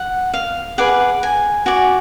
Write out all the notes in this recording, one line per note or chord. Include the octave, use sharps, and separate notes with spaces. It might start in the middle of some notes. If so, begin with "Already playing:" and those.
Already playing: F#5
F5
G#4 B4 D5 F#5
G#5
F#4 D5 G#5